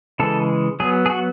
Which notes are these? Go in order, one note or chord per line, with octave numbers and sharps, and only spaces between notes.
C#3 E3 G#3 A4
F#3 B3 G#4
G#4
F#4